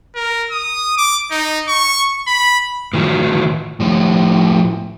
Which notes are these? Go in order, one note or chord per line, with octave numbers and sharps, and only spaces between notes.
A#4
D#6
D6
D#4
C#6
B5
A2 D#3 E3 F4 F#4
A2 F3